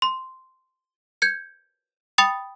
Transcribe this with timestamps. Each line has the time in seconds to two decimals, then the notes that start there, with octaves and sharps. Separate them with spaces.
0.02 C6
1.22 G6 G#6 C#7
2.18 G5 B5 D#6 A6 F7